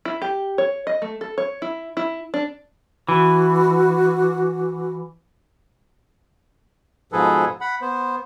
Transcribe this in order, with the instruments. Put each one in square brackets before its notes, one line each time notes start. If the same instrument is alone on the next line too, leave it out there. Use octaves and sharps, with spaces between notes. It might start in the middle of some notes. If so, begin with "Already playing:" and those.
[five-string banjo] E4
G4
C#5
D#5
A3
A4
C#5
E4
E4
D4
[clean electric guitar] E3 [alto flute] F#4
[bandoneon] G#2 B2 F3 G#4 A4 B4
F#5 B5
B3 C5